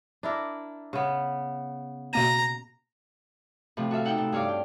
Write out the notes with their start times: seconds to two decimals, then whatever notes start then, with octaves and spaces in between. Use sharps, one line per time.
0.23 D4 E4 A#4
0.93 C#3 B3
2.13 B2 A#3 A#5 D#7
3.77 A2 C3 F3
3.91 F#4 A4 E5 F5
4.05 D#4 F#5 G5 E6 G6
4.18 A2
4.32 G2 C#5 F5 D6
4.49 G5